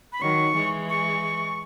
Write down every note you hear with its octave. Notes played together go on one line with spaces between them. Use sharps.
B5
D#3 F#3 C#6
E3 G#3
C#6